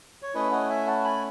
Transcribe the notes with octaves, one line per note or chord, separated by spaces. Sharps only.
C#5
A3 C#4 E4 B4 D#5
D#5 F#5
E5 G#5
F#5 A5
G#5 B5